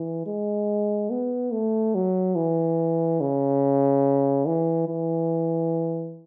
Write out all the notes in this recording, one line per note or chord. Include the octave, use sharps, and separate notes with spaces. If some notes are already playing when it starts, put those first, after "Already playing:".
Already playing: E3
G#3
B3
A3
F#3
E3
C#3
E3
E3